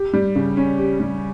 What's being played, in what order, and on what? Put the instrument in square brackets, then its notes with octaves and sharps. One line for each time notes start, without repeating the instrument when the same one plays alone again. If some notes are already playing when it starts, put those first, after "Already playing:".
Already playing: [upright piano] G4
G3
C#3
C#4
G4
G3